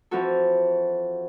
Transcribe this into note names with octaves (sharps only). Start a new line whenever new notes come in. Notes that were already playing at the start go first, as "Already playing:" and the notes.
E3 F3 C4 F#4 A4